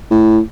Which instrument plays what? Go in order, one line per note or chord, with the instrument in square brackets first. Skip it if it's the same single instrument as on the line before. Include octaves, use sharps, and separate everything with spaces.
[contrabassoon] A2